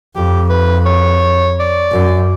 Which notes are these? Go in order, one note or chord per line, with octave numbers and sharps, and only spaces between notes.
F2 G4
B4
C#5
D5
F#2